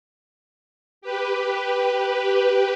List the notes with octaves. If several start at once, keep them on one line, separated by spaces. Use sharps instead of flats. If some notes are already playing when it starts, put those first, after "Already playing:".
G4 B4